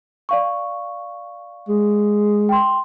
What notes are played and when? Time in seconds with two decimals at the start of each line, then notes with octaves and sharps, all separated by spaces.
0.29 D5 F5 C#6
1.68 G#3
2.49 G5 C6